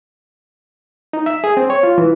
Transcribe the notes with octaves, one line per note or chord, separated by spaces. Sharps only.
D#4
E5
G#4
C4
C#5
F4
E3